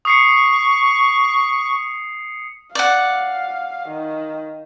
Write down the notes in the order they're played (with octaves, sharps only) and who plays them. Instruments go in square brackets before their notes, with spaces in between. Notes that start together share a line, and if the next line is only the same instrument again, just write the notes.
[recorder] C#6 [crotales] D#6 C7 C#7
[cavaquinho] D5 F#5 [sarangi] F5
[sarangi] D#3